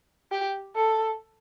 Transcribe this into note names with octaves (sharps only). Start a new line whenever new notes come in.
G4
A4